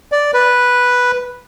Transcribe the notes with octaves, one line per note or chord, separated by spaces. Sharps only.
D5
B4